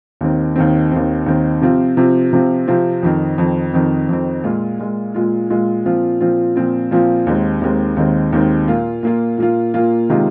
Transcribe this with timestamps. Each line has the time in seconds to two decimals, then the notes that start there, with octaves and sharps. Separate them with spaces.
0.21 D#2 D#3 C4
0.56 D#2 D#3 C4
0.91 D#2 D#3 C4
1.26 D#2 D#3 C4
1.62 C3 F3 C4 F4
1.97 C3 F3 C4 F4
2.33 C3 F3 C4 F4
2.67 C3 F3 C4 F4
3.03 F2 D#3 C4
3.38 F2 D#3 C4
3.73 F2 D#3 C4
4.09 F2 D#3 C4
4.44 A#2 G#3 F4
4.79 A#2 G#3 F4
5.14 A#2 G#3 F4
5.50 A#2 G#3 F4
5.85 A#2 F3 C4 F4
6.21 A#2 F3 C4 F4
6.56 A#2 F3 C4 F4
6.91 A#2 F3 C4 F4
7.27 D#2 D#3 G#3 C4
7.61 D#2 D#3 G#3 C4
7.97 D#2 D#3 G#3 C4
8.33 D#2 D#3 G#3 C4
8.68 A#2 A#3 F4
9.03 A#2 A#3 F4
9.38 A#2 A#3 F4
9.74 A#2 A#3 F4
10.09 C3 D#3 G#3 F4